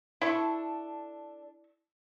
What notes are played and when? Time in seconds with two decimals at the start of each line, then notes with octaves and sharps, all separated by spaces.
0.21 D4 E4 A4 C#6